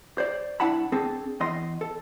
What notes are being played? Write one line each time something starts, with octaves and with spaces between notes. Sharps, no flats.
C5 D5
C2 D4 E4 F#5 A5 B5
C4 D4 G#4 A4
E2 D#5 C6
A4